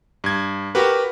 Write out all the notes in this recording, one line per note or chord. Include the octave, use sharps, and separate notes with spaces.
G2 G#6
F#4 G4 A#4 B4